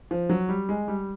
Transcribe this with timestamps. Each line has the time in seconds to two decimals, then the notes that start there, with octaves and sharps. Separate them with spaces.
0.11 F3
0.30 F#3
0.49 G3
0.69 G#3
0.88 G3